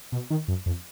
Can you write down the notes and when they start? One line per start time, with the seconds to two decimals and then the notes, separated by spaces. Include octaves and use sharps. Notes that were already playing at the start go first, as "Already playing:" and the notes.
0.12 B2
0.30 D#3
0.48 F#2
0.66 F2